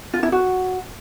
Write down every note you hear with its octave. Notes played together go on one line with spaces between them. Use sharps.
F4
E4
F#4